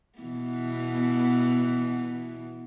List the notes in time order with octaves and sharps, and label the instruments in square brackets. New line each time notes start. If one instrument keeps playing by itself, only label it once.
[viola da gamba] B2 E3 B3